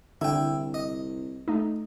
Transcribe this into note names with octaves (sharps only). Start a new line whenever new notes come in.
C2 D3 E4 G5
D#5
A3 D#4